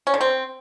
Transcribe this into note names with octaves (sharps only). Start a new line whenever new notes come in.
C#4
D3
C4